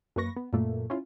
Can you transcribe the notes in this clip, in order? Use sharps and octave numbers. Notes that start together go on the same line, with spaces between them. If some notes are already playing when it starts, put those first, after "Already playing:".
F#2 A#3 B4 C#6 A#6
B3
F#2 A#2 A3 A#3
C#4 E4 F4